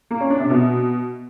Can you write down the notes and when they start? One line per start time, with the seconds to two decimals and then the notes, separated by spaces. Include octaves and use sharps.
0.11 A#3
0.20 C#4
0.30 D4
0.40 C3
0.50 B2